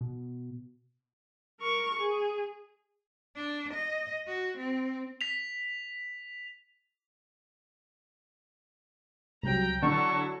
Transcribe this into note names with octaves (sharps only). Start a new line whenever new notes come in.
B2
A#4 C#6
G#4
D4
D#5
F#4
C4
B6 F7
C2 C3 F#3 G5 A#5
D3 F#3 E4 A5 C#6